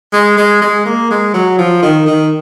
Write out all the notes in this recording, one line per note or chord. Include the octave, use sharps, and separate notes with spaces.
G#3
G#3
G#3
A#3
G#3
F#3
F3
D#3
D#3